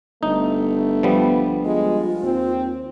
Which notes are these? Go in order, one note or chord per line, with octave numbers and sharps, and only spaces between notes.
G1 A3 D#4
F3 G3 B3
G#3 F4
D#2 C4